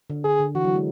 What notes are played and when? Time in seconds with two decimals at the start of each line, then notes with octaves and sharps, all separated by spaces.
0.10 D3
0.24 D3 G#4
0.40 D3
0.55 E3 F#4
0.65 F#3
0.75 G#3